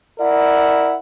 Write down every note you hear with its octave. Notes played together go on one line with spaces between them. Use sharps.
E4 A#4 D5 F#5